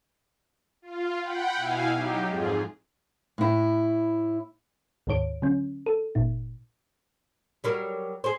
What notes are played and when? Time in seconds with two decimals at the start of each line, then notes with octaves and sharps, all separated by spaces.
0.82 F4
1.22 F#5 G5 B5
1.55 B2 E4 F5 G#5
1.93 F#3 D#4 G4
2.28 F2 G#2 F4 G#4
3.38 A2 E4
5.07 D2 G#2 D#3 C#5 D7
5.42 D3 F#3 C#4
5.86 A4
6.15 G1 A#2 D#4
7.64 F#3 G3 A#4
8.24 G#4 C5